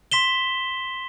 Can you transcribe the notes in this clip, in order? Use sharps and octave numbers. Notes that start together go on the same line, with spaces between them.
C6 B6 E7 G7